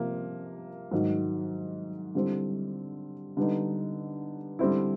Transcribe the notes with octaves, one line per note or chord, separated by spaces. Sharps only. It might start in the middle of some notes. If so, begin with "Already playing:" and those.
Already playing: C3 F3 A#3
G#2 D#3 F#3
D3 G3 C4 E4
D3 G3 B3 D#4
D3 G3 C4 E4